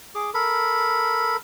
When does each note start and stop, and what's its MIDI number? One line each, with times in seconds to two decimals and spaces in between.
0.15 0.30 68
0.15 0.30 86
0.34 1.36 69
0.34 1.36 70
0.34 1.36 83